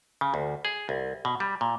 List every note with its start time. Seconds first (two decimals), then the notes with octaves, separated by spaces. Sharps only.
0.21 C#3
0.34 D2
0.65 G#4
0.89 C2
1.25 B2
1.40 G3
1.61 A#2